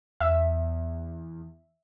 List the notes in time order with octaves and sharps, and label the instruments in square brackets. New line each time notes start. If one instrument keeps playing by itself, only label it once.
[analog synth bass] E2 [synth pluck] E5